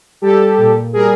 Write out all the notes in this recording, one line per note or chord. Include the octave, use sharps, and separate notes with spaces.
G3 G4 A4
A#2
G3 G#4 A#4